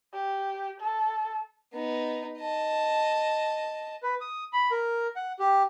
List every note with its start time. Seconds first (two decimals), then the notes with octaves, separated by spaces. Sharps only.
0.13 G4
0.80 A4
1.73 B3 D#4
2.39 D#5 A5
4.03 B4
4.21 D#6
4.53 B5
4.71 A#4
5.16 F#5
5.39 G4